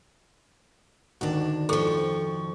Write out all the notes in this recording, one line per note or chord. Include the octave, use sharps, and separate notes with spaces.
D2 D#3 D4 D#4 F#4
F2 F3 A4 C#6